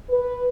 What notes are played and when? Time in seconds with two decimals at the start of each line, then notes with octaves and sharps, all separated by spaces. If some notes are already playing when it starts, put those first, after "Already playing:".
0.10 B4